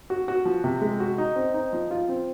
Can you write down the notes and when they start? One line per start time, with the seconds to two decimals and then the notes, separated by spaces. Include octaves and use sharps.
0.10 F#4
0.28 F#4
0.45 F3
0.64 C3
0.81 G#3
1.00 F#4
1.18 D#4
1.36 C4
1.54 D#4
1.73 F3
1.91 F4
2.09 C4